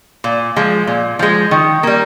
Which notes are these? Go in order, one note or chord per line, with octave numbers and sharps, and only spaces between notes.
A#2
F3 G#3
A#2
F3 G#3
D#3
G3 A#3